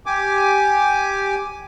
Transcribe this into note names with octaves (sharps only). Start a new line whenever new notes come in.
G4 G#5 D6